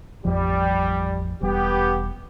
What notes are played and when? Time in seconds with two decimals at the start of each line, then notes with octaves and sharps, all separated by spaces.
0.25 A1 F2 F3 G3
1.41 E1 G3 B3 G4